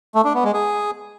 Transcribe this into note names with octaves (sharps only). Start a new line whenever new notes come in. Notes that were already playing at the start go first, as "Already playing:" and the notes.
A3
D4
B3
G#3
G#4